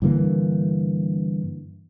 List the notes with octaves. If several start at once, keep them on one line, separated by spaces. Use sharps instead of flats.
G2 D3 E3 A#3